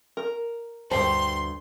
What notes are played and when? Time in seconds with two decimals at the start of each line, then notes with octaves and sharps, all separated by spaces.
0.17 A#4
0.91 D2 G2 G4 C5 G5 A5 C6